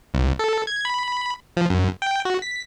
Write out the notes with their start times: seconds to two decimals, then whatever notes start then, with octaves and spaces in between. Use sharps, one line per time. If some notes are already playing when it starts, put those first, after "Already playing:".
0.14 C2
0.39 A4
0.67 G#6
0.85 B5
1.57 F3
1.70 F#2
2.02 G5
2.25 F#4
2.42 B6